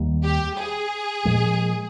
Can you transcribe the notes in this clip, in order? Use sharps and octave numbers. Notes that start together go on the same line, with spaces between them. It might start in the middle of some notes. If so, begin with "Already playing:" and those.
Already playing: D#2 D#3 G3 A#3
G4
G#4
A#2 F3 G#3